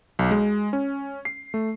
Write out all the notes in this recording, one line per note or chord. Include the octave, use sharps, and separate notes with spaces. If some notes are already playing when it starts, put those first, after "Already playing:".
B1
G#3
C#4
C7
A3